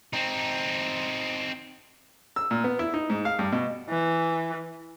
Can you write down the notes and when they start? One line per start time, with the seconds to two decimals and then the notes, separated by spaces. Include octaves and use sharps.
0.13 C4 D#4
2.36 E6
2.51 A#2
2.64 B3
2.79 E4
2.94 D#4
3.10 G#2
3.25 F5
3.39 G2
3.52 B2
3.89 E3